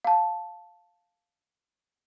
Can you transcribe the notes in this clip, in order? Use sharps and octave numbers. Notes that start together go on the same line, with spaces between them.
F5 A5